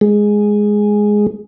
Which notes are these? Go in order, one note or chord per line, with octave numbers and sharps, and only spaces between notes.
G#3